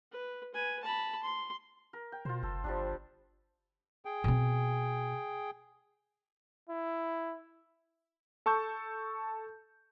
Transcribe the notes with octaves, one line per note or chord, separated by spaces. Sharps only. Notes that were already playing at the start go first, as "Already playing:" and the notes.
B4
B4 G#5
A5 B5
C6
A#4
G5
B2 F4 C5
F#1 A4
G1 F3 G3 D4
G#4 G5
B2 C4
E4
A4 A5 C#6 E6 G6